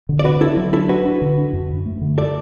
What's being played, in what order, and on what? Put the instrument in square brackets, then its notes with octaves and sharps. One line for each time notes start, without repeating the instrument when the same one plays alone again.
[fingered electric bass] D3
[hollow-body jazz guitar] D5
[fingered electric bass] D3 [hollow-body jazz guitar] F#4 B4
[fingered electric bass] D4 [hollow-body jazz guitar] E4 A4
[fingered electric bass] F#3
[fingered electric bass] D4 [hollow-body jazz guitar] E4 A4
[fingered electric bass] D4 [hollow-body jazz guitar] F#4 B4
[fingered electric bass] D4
D3
D4
F#2
F#2
A3
D3
[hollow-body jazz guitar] A4 D5